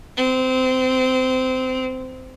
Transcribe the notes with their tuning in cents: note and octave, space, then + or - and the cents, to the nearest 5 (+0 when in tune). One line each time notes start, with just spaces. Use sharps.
C4 -20